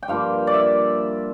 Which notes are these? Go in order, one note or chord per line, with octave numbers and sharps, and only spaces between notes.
G5
G2 F3 A#3 F5
D5
E5